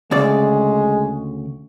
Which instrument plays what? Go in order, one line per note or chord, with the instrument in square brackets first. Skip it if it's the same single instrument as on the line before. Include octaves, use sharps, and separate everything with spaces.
[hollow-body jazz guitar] D2 C#3 D5 [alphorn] G#3